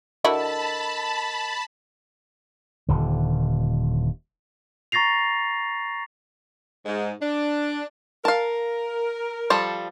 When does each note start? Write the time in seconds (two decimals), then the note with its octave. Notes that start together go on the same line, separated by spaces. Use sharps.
0.24 D3 E4 F#4 A#4 D#5 A5 B5 E6
2.89 D#1 D3
4.92 A#5 C#6 A6 A#6 C7 F7
6.86 G#2
7.21 D4
8.25 A#4 F5 A5
9.50 F3 G3 A4